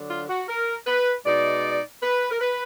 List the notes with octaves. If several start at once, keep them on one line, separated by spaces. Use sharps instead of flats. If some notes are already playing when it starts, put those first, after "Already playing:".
Already playing: D3 F#3 D4
F4
F#4
A#4
B4
B2 G#3 D#4 D5
B4
A#4
B4